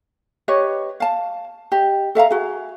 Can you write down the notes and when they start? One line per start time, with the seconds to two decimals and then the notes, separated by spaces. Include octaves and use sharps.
0.48 G4 B4 C#5 D#5
1.00 F5 A5
1.72 G4 D#5
2.15 A4 E5 F5 A#5
2.30 F#4 G#4